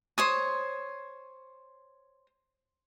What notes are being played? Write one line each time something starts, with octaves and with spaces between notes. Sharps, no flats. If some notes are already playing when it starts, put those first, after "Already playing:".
C5 C#5 D#6